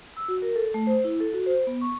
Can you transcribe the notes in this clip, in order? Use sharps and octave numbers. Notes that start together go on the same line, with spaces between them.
E6
F#4
A#4
A4
A3
C5
E4
A4
F#4
C5
B3
C#6